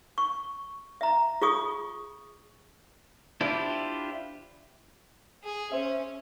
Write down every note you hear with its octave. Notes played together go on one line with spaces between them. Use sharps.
C#6
E5 A#5
F4 G#4 C#6 D#6
D4 E4 F4 G4 C5
G#4
C#4 C5 E5